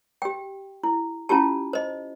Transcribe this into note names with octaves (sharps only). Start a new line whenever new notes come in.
G4 G5
E4
C#4 E4 F4 G4 A5
C5 D#5